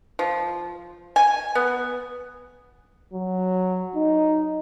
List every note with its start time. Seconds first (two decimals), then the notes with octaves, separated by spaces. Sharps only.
0.19 F3
1.16 G#5
1.55 B3
3.14 F#3
3.96 D#4